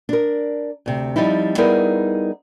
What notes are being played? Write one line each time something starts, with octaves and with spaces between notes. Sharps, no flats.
D4 A#4
D2 C3
F3 G3 C4 D#4 E4
G3 B3 D#4 E4 G#4 A#4